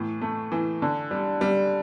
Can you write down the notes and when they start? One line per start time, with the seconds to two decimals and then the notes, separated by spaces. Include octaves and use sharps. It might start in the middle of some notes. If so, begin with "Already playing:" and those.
Already playing: A2 E3
0.21 A3
0.52 E3
0.82 D3
1.11 G3
1.41 G3